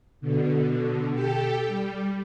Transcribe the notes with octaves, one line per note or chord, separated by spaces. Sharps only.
B2 D3
G4 A4 G5
G3